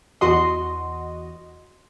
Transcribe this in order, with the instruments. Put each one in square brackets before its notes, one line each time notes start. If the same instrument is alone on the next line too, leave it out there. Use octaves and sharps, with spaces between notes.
[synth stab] E2 F#4 D#5 [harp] C6